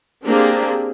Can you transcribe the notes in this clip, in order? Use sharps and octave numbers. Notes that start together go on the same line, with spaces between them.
A#3 C4 D4 G4 G#4